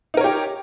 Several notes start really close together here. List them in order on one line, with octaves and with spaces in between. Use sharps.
D#4 A#4 C#5 G4